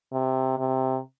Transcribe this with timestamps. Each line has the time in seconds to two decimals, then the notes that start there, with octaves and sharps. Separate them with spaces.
0.13 C3
0.58 C3